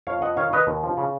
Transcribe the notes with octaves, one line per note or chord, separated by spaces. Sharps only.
F2 C#5 F5
F2 D#5 F#5
D#3 C#5 F5
D#3 B4 D#5
D#2
F3
C#3